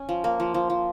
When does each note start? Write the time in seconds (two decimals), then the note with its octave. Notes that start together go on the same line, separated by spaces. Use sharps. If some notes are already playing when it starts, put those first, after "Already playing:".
Already playing: C#4 G#5
0.09 F3
0.24 A#3
0.40 F3
0.54 F3
0.70 F3